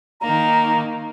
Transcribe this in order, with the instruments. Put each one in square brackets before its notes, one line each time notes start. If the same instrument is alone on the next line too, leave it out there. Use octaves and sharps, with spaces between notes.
[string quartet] D#3 A#3 [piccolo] A#5